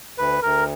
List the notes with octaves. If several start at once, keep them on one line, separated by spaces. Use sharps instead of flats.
D2 B4
D2 A#4